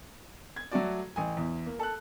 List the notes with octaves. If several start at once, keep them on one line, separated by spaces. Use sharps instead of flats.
G#6
F#3 A3 F#4 D5
A1 G#5
E2
A#3
A4 F#6